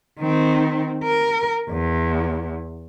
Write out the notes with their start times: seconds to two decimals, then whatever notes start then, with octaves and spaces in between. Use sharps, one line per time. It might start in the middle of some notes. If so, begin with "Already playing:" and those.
0.20 D#3 C4
1.04 A#4
1.70 E2